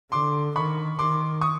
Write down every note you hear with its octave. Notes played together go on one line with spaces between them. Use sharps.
D3 C6 D6
D#3 B5 C#6
D#3 C6 D6
C#6 D#6